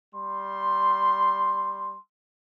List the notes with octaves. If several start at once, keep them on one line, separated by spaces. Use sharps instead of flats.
G3 C6